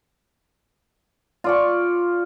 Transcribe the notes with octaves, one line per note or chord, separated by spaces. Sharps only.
F4 D5 C#6